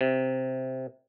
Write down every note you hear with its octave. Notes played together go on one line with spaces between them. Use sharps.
C3